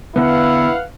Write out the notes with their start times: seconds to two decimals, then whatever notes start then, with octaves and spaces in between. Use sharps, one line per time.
0.16 D3 B3 E4 B4 F5 F#5